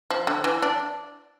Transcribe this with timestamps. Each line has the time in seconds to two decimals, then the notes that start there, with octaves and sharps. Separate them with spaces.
0.10 F3
0.27 D3
0.44 E3
0.62 D4